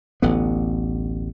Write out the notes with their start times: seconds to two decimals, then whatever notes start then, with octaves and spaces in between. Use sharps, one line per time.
0.22 A1 D2 D3 B3